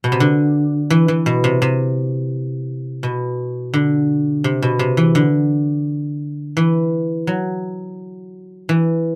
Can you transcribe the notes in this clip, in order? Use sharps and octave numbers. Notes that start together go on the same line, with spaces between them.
B2
C3
D3
E3
E3
B2
C3
C3
B2
D3
C3
B2
C3
E3
D3
E3
F#3
E3